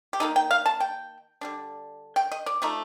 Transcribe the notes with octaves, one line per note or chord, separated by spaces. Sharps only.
G4
D#3 A#3 D#4 A4
G5
F5
A5
G5
D3 G3 D4
G5
D#5
D5
F3 A3 D#4